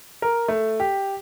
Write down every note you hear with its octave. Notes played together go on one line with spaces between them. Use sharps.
A#4
A3
G4